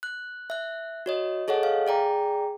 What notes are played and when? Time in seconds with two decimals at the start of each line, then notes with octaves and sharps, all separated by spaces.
0.03 F#6
0.50 E5 F#6
1.06 F#4 C#5 D#5
1.48 G#4 A4 C#5 D#5 F#5
1.63 F5
1.87 G#4 D5 G5 A#5